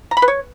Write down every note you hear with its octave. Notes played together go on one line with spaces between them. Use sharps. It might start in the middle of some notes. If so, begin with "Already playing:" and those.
A#5
B5
B4
C#5